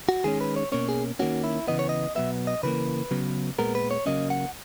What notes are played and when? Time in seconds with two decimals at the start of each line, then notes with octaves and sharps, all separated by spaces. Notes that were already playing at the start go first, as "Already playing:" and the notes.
0.09 F#4
0.24 D#3 G#3 C#4 G#4
0.41 B4
0.56 C#5
0.72 B2 A#3 C#4 C#5
0.89 G#4
1.19 D#3 A#3 C#4 F#4
1.44 E4
1.67 C#3 E3 B3 D#5
1.79 C#5
1.89 D#5
2.15 B2 F#3 B3 E5
2.47 D#5
2.63 C#3 E3 A#3 B4
3.11 C#3 F#3 B3
3.59 A#2 G#3 B3 A#4
3.75 B4
3.91 C#5
4.06 C#3 F#3 A#3 C#4 D#5
4.30 F#5